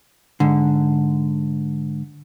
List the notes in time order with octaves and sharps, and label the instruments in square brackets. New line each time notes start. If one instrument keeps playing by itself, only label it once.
[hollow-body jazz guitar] G#2 D3